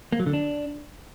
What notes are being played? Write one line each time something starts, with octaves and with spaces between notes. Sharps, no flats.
A#3
F#3
D3
D4